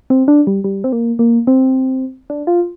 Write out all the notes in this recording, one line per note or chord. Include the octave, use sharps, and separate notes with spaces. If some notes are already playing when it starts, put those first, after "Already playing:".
C4
D4
G3
G3
C4
A#3
A#3
C4
D4
F4